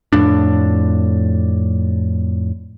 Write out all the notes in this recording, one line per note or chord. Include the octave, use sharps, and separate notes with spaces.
F2 A2 D4